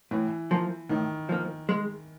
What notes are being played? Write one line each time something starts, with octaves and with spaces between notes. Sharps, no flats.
A2 E3
F3 A#3
A2 D#3
F3 A#3
G#3